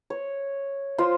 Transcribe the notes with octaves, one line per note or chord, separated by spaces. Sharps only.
C#5
F4 C5